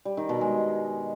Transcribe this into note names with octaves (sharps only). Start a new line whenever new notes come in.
G3
D#3
B2
G#3